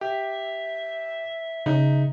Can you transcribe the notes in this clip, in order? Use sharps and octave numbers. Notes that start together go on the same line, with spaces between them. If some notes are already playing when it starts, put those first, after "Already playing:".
G4 E5
C#3 D#4